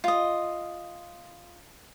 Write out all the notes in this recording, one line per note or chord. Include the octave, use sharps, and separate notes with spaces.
F4 D#5